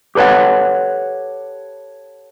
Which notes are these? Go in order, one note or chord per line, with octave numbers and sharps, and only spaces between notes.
G4 A4 B4 C#5 F#5